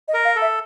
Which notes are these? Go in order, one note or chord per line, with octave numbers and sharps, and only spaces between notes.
D#5
A#4
F5
A4
E5